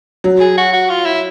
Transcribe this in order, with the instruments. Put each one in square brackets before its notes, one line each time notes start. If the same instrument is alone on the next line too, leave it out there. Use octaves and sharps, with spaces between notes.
[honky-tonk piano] F#3
[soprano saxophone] G#4
F#4
F#4
F4
E4